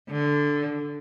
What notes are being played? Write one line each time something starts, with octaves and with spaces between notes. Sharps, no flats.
D3